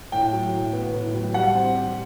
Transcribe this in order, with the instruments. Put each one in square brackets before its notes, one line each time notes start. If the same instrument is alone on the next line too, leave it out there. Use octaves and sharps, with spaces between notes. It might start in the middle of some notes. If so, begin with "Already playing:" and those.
[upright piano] A2 [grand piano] G5
[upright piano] F#3
A2
B3
A2
F#3
[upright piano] G3 [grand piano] F#5
[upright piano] C4
G4